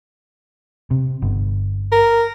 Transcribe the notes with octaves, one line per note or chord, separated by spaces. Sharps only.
C3
G1
A#4